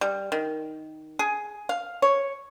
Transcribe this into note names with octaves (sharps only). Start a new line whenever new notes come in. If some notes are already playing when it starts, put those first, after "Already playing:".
G3
D#3
G#4
F5
C#5